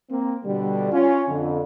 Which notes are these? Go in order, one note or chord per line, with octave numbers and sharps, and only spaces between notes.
A#3 C4
B2 D3 G3
C#4 F4
F2 D3